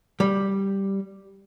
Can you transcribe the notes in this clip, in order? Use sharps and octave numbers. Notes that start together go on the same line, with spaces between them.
G3